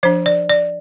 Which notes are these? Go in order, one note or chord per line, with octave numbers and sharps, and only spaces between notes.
F3 D4 C5
D5
D5